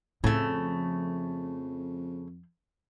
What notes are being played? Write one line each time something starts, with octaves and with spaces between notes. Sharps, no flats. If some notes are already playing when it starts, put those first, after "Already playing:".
F2 A2 C#3 F3 A3